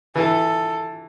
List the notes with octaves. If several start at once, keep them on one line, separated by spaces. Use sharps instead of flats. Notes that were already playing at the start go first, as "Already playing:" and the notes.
E3 A4